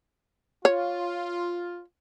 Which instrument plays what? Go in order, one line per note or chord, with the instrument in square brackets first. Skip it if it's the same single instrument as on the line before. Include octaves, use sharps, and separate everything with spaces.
[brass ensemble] F4 [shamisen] C#5